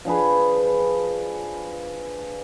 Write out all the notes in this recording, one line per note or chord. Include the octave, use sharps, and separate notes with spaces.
F3 D4 G#4 B4